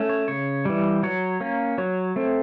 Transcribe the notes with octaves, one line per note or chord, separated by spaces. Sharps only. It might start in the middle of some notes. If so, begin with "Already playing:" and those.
Already playing: A3 C#4
C#5
C#3 C#5
E3 G3
F#3 C#5
A#3 C#4
F#3 C#5
A3 C4